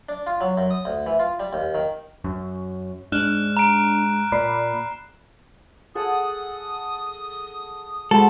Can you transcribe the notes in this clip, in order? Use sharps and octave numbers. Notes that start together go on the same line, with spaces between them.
D4
F4
F#3
F#2
D#6
D2
E3
F4
G3
D#2
D#3
F#2
G#2 D4 F6 F#6 E7
A#5 D7
A#2 D5 B5 C7
G#4 A4 F#5 D#6
G#3 F#4 A4 C5 B5